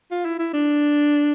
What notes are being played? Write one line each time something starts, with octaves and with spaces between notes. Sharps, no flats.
F4
E4
E4
D4